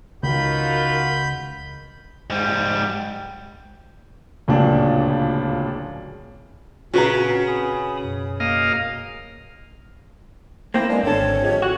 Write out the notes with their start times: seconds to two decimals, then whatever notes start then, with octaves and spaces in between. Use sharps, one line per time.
0.23 C#2 D#4 F4 F#4 A#4 B5 G6
2.30 G#2 G3
4.48 D1 C#2 A#2 C#3 D4
6.94 A#2 C#3 C4 F#4 B4 A#5
7.47 G#5 B5 D#6
8.00 F#2 B2
8.40 A#3 D#5 F5
10.74 A#3 C4 E4 C5 G5 A#6
10.90 G#3 B3 D4
11.03 G#1 D3 C4 A4 C#5
11.42 F3 G#3 G4
11.62 F#4 F#5 F#6